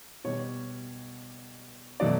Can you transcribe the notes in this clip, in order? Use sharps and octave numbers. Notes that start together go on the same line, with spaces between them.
B2 G3 C#5
B2 F#3 A3 D5